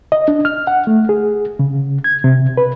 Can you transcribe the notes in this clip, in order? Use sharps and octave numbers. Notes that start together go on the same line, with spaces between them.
D#5
D4
F6
F#5
A3
G#4
C#3
G#6
C3
B4